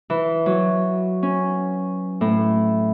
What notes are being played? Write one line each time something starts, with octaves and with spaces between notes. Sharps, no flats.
E3
F#3
C#4
A2